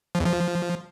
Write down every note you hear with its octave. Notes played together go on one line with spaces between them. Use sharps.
F3
E2
F3